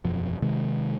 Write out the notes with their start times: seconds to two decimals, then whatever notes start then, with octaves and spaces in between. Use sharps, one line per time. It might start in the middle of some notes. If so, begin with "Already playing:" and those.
0.05 E1 F#2 F3
0.42 C3 D#3 G#3